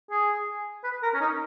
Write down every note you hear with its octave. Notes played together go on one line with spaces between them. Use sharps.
G#4
B4
A#4
C#4
D#4